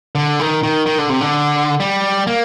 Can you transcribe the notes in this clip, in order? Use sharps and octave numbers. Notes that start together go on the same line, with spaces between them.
D3
D#3
D#3
D#3
D3
C3
D3
G3
A#3